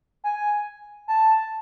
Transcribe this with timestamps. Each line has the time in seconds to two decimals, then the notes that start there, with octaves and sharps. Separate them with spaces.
0.24 G#5
1.08 A5